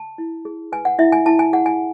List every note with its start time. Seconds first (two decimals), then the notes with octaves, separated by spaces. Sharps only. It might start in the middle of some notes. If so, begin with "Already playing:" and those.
Already playing: A5
0.18 E4
0.45 G#4
0.72 B4 G#5
0.85 F#5
0.99 E4 E5
1.12 G#5
1.26 E4 A5
1.39 G#5
1.53 G#4 F#5
1.66 G#5